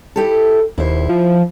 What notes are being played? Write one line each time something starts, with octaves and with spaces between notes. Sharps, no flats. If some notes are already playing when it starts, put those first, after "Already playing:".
E4 G4 A4
D#1 E4 C5
F3